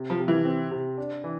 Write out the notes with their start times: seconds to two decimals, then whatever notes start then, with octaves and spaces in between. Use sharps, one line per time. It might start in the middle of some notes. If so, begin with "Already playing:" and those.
Already playing: C3
0.10 F3
0.19 C3
0.28 E3
0.45 C4
0.71 C3
0.98 D4
1.24 E3